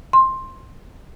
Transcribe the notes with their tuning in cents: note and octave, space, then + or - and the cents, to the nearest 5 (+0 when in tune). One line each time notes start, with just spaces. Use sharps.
C6 +10